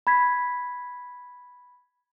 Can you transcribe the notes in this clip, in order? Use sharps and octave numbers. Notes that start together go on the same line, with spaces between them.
B5 G#6 B6